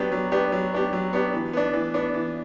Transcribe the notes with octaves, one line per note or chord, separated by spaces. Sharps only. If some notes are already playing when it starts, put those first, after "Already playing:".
Already playing: F#3 B3 D4 G4
F#3
B3 D4 G4
F#3
B3 D4 G4
F#3
B3 D4 G4
E3
B3 D4
E3
B3 D4
E3